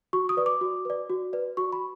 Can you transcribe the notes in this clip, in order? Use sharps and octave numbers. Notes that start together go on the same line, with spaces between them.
F#4 C#6
D#6
B4 D5
D6
F#4
B4 D5
F#4
B4 D5
F#4 C#6
B5